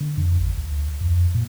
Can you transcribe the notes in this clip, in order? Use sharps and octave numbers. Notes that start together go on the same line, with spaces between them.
D3
F2
A1
D2
F2
A#2